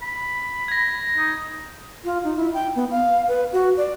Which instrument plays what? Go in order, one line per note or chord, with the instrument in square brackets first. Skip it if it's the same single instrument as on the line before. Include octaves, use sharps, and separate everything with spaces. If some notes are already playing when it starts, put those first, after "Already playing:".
[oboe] B5
[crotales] G#6 A#6
[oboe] D#4
[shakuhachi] F4
D#4
E4
G5
B3
F5
B4
F#4
D5